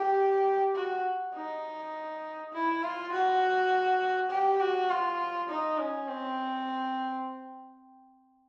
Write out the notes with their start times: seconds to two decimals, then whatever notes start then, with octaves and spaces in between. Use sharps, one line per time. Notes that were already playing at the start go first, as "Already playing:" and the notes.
Already playing: G4
0.75 F#4
1.35 D#4
2.53 E4
2.83 F4
3.12 F#4
4.30 G4
4.60 F#4
4.89 F4
5.49 D#4
5.79 C#4
6.08 C4